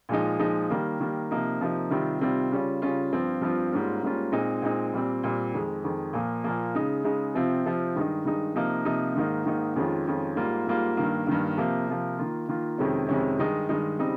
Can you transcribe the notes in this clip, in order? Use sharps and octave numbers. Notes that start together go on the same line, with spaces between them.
A#2 F3 G#3 D#4
A#2 F3 G#3 D#4
D#3 G3 A#3
D#3 G3 A#3
C3 F3 A#3 D#4
C3 F3 A#3 D#4
C3 D#3 G3 C4 F4
C3 D#3 G3 C4 F4
C#3 G3 C#4 F4
C#3 G3 C#4 F4
G2 F3 C4 F4
G2 F3 C4 F4
G#2 G3 A#3 C#4 F4
G#2 G3 A#3 C#4 F4
A#2 G#3 C4 D#4
A#2 G#3 C4 D#4
A#2 G3 C4
A#2 G3 C4
F2 D#3 G#3
F2 D#3 G#3
A#2 F3 A#3
A#2 F3 A#3
C#3 G#3 D#4
C#3 G#3 D#4
C3 F3 C4 F4
C3 F3 C4 F4
G2 D#3 G#3 D#4
G2 D#3 G#3 D#4
C3 F3 A#3 D#4
C3 F3 A#3 D#4
G#2 D#3 A#3 D#4
G#2 D#3 A#3 D#4
F2 D#3 G#3 C#4 F4
F2 D#3 G#3 C#4 F4
G#2 G3 A#3 F4
G#2 G3 A#3 F4
G2 D#3 A#3
G2 D#3 A#3
C3 F3 A#3
C3 F3 A#3
D#3 A#3 F4
D#3 A#3 F4
F2 C3 D#3 G#3 C#4
F2 C3 D#3 G#3 C#4
G2 D#3 G#3 D#4
G2 D#3 G#3 D#4
C#3 G3 C4 D#4